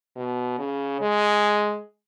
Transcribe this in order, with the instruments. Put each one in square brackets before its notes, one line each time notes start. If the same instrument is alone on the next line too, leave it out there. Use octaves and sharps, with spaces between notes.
[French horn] B2
C#3
G#3